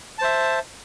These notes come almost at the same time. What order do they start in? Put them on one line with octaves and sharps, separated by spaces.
A5 C5 E5